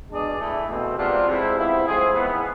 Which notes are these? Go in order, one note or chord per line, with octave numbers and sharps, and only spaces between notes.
B2 G#3 D4 G#4 D5
E3 A3 E4
B2 A3 C4
C3 G#3 B3 D4 F4
C3 F3 G#3 C4 E4
G#2 F3 B3 E4
A2 F3 G#3 C4 G#4
G#2 E3 B3